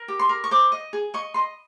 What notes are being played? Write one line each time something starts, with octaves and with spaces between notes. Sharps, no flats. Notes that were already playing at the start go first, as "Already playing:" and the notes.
Already playing: A#4
G4
C6
A#4
C#6
C5 D6
D#5
G#4
D#5 C#6
D#5 C6